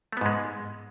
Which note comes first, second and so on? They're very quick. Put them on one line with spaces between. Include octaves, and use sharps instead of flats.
A3 B3 G#2 G#3